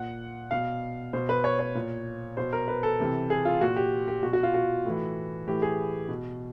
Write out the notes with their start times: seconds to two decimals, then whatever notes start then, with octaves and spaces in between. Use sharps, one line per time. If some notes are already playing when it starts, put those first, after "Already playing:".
Already playing: A#2 F#5
0.51 B2 F5
1.13 B2 C5
1.29 B4
1.44 C#5
1.59 C#5
1.75 A#2
2.37 B2 C5
2.53 A#4
2.68 B4
2.83 A4
2.99 C3 E3
3.30 G#4
3.45 F4
3.61 A#2 F#4
3.76 G4
4.08 G4
4.23 B2 F#4
4.33 F#4
4.43 F4
4.54 F#4
4.85 A2 E3
5.47 A2 E3 G4
5.62 G#4
6.09 B2